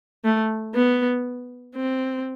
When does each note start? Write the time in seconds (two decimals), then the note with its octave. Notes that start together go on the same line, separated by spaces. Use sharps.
0.24 A3
0.75 B3
1.76 C4